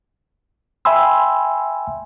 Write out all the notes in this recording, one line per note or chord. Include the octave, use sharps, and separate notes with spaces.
E5 G5 G#5 B5 C6 E6